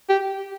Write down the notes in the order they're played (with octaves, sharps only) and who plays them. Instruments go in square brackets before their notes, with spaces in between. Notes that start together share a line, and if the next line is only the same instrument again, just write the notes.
[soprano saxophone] G4